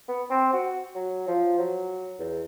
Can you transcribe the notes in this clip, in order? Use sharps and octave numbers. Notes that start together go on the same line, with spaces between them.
B3
C4
F#4
F#3
F3
F#3
E2